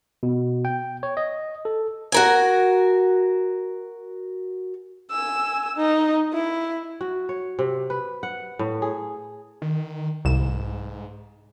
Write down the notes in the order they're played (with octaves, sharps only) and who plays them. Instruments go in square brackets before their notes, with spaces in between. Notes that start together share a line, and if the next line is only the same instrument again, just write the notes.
[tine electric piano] B2
G5
C#5
D#5
A4
[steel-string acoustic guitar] F#4 A#4 G#5
[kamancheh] G#5 E6
D#4
E4
[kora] F#4
C#5
C3
B4
F#5
A2
G#4
[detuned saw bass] D#3
[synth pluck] C2 E7 [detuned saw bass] G#2